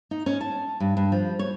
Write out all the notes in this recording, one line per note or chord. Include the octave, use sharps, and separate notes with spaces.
D#4
C#4
A5
G2
G2
F3
C#5